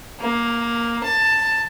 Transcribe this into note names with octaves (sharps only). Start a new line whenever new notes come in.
A#3
A5